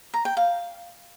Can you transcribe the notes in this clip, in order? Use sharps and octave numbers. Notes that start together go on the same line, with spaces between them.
A#5
G5
F5